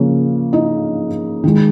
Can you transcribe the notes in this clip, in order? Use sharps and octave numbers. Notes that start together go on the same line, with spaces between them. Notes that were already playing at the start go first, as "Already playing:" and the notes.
Already playing: C#3 F3 A#3 C#4 C#5
D#4 D#5
D#3 G#3